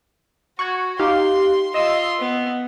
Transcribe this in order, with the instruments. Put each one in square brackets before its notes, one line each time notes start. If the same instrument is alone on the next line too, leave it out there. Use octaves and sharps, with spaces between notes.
[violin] F#4 [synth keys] C#6 F#6 G#6
[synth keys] D#4 G4 F5 [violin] C6
[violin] F4 C6 [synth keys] D#5 E6
[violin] B3